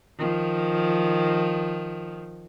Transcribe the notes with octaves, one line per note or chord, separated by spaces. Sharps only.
D#3 F3